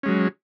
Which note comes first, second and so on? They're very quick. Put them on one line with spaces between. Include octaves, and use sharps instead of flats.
C#4 G#3 F#3